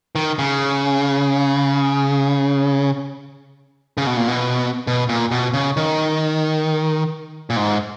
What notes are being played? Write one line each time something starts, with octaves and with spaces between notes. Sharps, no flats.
D#3
C#3
C#3
B2
A#2
B2
B2
A#2
B2
C#3
D#3
A#2
G#2